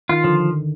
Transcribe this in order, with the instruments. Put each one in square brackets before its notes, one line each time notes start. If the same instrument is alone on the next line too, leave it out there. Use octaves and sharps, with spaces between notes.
[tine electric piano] D#3 [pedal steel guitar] F4
[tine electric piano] D3 [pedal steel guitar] F3